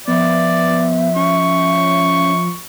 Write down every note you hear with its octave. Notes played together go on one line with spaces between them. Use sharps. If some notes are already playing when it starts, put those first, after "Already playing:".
F3 B3 D5 E5
C#4 C#6